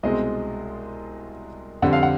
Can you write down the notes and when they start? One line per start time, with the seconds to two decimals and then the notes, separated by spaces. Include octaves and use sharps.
0.03 C2 B2 G#3 C4 D#5
1.82 F2 D3 G3 C4 F#5
1.93 F5
2.03 F#5